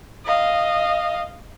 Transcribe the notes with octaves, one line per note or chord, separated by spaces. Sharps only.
D#5 F5